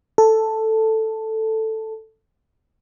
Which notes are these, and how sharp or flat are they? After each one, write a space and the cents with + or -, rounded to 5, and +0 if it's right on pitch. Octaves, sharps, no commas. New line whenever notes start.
A4 +5